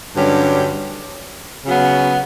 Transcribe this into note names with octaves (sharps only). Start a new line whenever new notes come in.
G2 D3 F#3 C#4 G4
C#3 F#3 B3